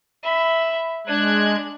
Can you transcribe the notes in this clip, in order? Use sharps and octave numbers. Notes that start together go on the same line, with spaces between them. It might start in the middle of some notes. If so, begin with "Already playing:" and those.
E5 B5
G#3 D4 F#6 G#6